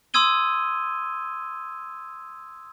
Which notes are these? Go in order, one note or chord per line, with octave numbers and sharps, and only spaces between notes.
C6 D#6 E6 G#6 D#7 G7